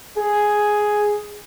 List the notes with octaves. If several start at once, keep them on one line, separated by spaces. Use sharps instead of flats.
G#4